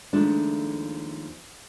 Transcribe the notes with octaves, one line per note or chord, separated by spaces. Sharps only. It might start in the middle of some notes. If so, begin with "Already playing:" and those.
D#2 F3 G#3 A3 D4